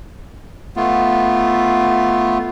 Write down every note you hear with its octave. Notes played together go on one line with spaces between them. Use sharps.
A3 B3 F4